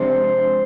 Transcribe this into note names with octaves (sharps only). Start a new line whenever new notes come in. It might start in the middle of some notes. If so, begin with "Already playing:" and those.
Already playing: C3 F3 G#3 D4 C5